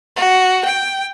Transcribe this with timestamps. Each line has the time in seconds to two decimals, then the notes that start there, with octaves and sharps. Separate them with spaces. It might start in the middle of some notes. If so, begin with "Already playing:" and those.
0.16 F#4
0.64 G5